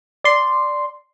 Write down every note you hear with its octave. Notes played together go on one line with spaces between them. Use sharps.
D5 C6